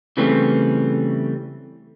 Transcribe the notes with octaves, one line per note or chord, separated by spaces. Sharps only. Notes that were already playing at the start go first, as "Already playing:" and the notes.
C#3 E3 G3 A3 C4 C#4